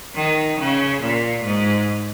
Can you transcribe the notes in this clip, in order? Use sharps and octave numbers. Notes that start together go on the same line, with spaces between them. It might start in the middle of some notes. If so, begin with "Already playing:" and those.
D#3
C#3
A#2
G#2